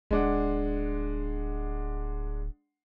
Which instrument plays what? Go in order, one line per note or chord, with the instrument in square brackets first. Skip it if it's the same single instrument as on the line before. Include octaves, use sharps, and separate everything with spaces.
[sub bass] D1 [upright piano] G#3 D4 F#5